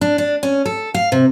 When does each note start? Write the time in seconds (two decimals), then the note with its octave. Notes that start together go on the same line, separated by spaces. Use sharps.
0.01 D4
0.18 D4
0.43 C#4
0.66 A4
0.94 F5
1.12 C3